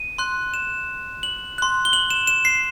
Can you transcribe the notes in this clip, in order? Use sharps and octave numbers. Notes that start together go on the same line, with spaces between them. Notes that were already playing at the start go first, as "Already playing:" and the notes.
Already playing: D#7
C6 F#6
E7
F#7
C6 F#6
G7
F#7
E7
E7
C7